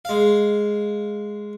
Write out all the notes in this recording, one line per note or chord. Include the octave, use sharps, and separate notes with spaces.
G#3 F5